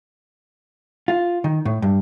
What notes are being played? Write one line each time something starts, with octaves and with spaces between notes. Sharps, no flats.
F4
D#3
A2
G2